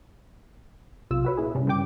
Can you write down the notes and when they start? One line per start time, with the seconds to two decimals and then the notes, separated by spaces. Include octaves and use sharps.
1.11 B1 C3 F4 E6
1.25 F#4 B4 C#5
1.37 A#2 E4 G#4
1.55 G2 C3 G3 C#4
1.67 G2 C#3 G3 G5 D6